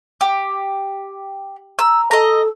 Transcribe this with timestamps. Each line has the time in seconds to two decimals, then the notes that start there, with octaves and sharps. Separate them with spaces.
0.21 G4
1.79 A#5 E6
2.11 A4 D#5 A#5